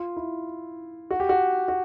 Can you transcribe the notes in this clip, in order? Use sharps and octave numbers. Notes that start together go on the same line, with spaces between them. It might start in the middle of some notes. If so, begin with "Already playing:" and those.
Already playing: F4
E4
F#4
G4
F#4
F#4